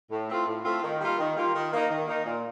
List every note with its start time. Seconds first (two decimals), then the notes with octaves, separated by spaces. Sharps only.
0.10 A2
0.29 A3 C4 F4
0.46 A2
0.64 A3 C4 F4
0.82 D#3
0.99 G3 A#3 F4
1.18 D#3
1.35 G3 A#3 F4
1.53 D#3
1.71 A#3 D#4
1.89 D#3
2.07 A#3 D#4
2.24 A#2